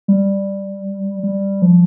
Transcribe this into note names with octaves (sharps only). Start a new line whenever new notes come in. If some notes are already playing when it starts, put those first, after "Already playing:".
G3
G3
F3